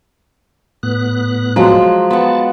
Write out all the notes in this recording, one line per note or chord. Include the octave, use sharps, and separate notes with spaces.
A2 B3 F#6
F3 F#3 G#3
B3 F#5 A5